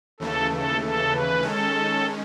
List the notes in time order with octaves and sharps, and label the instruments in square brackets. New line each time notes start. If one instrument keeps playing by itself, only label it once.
[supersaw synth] D#2 C#3 E3 A3 [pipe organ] A4
[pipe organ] A4
A4
B4
[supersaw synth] D#3 G#3 C#4 [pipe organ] A4